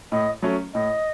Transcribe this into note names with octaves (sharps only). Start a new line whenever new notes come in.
A2 D#5
F#3 A3 C#4
A2 D#5